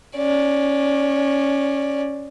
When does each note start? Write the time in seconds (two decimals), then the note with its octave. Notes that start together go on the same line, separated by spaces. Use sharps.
0.16 C#4 D5